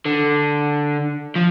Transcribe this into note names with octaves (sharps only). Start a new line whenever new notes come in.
D3
F3